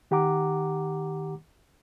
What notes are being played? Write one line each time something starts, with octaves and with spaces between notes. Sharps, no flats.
D#3 G4 F#5 A#5 D6